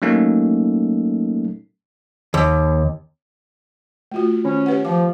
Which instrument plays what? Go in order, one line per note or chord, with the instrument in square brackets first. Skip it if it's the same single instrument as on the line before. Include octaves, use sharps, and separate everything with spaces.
[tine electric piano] F#3 A3 A#3 C#4 D#4 A4
[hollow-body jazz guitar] D#2
[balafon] A3 F4 F#4
[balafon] D#3 [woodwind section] C#4
[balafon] G4 B4 F#5
[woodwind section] F3 [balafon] D6